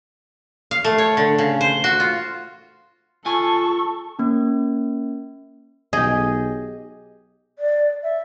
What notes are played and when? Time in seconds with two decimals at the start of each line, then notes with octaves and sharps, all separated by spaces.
0.71 F5
0.84 A3
0.98 C#5
1.17 D3
1.38 C#3
1.61 C5
1.84 F#4
2.00 F4
3.26 F4 A4 G#5 C#6
4.19 A#3 C#4
5.93 B1 G4 G#4 D#5
7.59 D5
8.03 E5